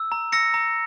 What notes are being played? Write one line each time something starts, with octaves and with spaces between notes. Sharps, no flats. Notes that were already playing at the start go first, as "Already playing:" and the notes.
Already playing: E6
A#5
E6 A#6 C#7
A#5